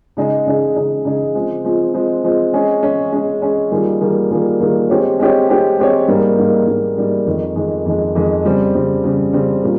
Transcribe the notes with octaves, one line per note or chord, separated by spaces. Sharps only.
C#3 G#3 D#4 G#4
C#3 G#3 D#4 G#4
C#3 G#3 D#4 G#4
C#3 G#3 D#4 G#4
F3 G#3 C4
F3 G#3 C4
F3 G#3 C4
F3 G#3 C4
G#3 C#4 G#4
G#3 C#4 G#4
G#3 C#4 G#4
G#3 C#4 G#4
D#3 G3 A#3 F4 G#4
D#3 G3 A#3 F4 G#4
D#3 G3 A#3 F4 G#4
D#3 G3 A#3 F4 G#4
G#3 C4 G4 C#5
G#3 C4 G4 C#5
G#3 C4 G4 C#5
G#3 C4 G4 C#5
G#2 G3 A#3
G#2 G3 A#3
G#2 G3 A#3
G#2 G3 A#3
F2 D#3 G#3
F2 D#3 G#3
F2 D#3 G#3
F2 D#3 G#3
C#3 G3 C4
C#3 G3 C4
C#3 G3 C4
C#3 G3 C4
A#2 G3 A#3